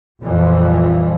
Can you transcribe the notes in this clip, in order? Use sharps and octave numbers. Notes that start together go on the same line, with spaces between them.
A#1 F2 E3 F3 G3